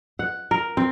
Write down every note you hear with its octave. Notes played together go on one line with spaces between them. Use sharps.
F#5
A#4
C4